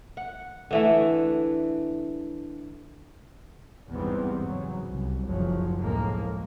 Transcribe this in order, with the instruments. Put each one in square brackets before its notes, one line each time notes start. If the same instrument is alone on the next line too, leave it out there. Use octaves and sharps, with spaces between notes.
[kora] F#5
D3 E3 A3
[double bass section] A1 E2 G#2 G3 B3 C4
C#3 F#3
C2
F#1 E2 F3 F#3
D2 A2 F3 G#3 A#3